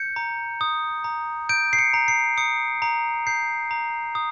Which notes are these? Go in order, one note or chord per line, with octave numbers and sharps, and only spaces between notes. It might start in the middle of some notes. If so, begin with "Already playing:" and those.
Already playing: G6 C#7
A#5
D#6
A#5
G6 D7
C7
C#7
A#5
C7
D#6 C#7
A#5
G6 C7
A#5
D#6